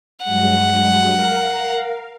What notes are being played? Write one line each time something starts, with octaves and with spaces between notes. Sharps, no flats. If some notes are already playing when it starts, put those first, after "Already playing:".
G2 F#3 G#3 F#5
A#4 F5